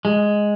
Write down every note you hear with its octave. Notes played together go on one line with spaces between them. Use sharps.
G#3